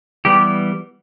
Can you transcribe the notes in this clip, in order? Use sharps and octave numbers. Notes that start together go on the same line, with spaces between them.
E3 G3 B3 G4